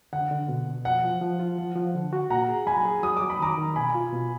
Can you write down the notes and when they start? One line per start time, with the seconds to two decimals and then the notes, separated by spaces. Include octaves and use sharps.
0.13 D3 F#5
0.31 D3
0.48 B2
0.67 B2
0.85 F3 F#5
1.04 F3
1.21 F3
1.39 F4
1.58 F3
1.75 F3
1.95 D3
2.13 F#4
2.30 A#2 F#5 A#5
2.49 G#4
2.66 F#3 G#5 B5
2.85 G#4
3.03 F#3 D#6
3.17 D6
3.22 F#3
3.30 B5
3.39 D#3 A#5 D6
3.57 D#3
3.76 B2 G#5 B5
3.94 F4
4.12 B2